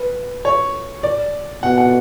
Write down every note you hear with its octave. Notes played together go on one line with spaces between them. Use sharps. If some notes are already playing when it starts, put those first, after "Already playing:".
Already playing: B4
C#5
D5
B2 F#5
F#5